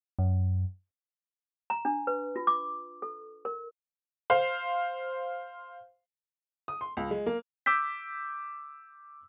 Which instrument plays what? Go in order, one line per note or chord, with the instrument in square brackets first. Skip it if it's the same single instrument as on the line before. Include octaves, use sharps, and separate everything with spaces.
[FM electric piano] F#2
[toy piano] A#5
D4
B4
F4
D6
A4
A#4
[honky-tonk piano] C5 F5
[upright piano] D#6
C6
C#2
G#3
A#3
[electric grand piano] D6 E6 G6 B6